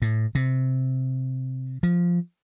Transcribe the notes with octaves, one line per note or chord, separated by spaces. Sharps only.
A2
C3
F3